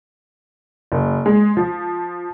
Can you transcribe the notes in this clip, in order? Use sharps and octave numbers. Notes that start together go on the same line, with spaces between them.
F#1
G#3
F3